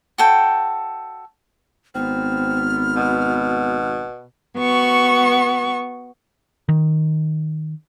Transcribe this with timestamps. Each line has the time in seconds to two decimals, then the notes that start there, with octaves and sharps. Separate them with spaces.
0.18 F#4 A4 G5
1.95 G#1 B3 C4 F6
2.96 B2
4.57 B3 F#4 C#6
6.69 D#3